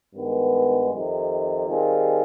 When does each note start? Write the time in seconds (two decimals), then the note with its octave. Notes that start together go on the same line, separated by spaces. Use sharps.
0.15 G2 D#3 G#3 B3
0.92 F2 C3 D#3
1.68 D#3 G3 C4 F4 G#4